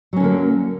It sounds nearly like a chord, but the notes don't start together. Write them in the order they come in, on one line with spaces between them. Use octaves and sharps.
F#3 C#4 D3 A#3